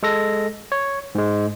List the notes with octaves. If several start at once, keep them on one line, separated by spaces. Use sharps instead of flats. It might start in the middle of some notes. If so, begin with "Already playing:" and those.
G#3 A4 A#6
C#5
G#2 G#3